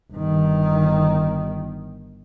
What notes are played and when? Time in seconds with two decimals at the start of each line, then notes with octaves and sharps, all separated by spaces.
0.13 G1 D#3